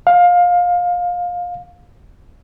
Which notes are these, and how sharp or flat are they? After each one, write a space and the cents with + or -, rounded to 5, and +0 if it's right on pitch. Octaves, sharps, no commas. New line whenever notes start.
F5 +20